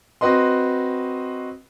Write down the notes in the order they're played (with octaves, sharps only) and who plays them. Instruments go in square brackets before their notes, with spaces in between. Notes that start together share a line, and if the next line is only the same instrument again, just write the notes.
[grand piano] C4 F#4 B4 D#5 C6